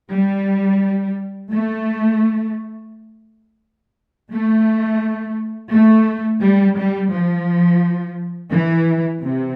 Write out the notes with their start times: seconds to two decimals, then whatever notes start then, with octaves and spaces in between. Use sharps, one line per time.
0.12 G3
1.52 A3
4.33 A3
5.72 A3
6.42 G3
6.77 G3
7.12 F3
8.52 E3
9.22 C3